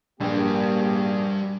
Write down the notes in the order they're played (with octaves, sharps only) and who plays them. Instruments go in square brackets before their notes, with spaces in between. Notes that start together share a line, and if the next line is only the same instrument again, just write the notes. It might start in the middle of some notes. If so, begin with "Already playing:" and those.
[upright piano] A#1 [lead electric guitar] G3 B4 [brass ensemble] A#3 G4